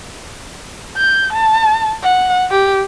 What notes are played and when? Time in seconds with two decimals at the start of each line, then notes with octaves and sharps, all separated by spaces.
0.97 G6
1.33 A5
2.03 F#5
2.51 G4